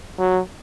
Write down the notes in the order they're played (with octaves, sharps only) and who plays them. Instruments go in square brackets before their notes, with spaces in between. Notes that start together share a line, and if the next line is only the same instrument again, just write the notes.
[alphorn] F#3